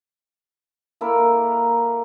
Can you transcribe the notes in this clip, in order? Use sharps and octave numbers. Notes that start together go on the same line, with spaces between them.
A#3 E4 A4 A#4